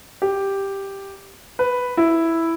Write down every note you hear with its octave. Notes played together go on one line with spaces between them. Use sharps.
G4
B4
E4